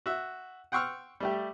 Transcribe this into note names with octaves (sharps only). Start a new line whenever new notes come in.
F#4 E5
F#5 G5 C6 C#6 E6 F6
G3 A3 G4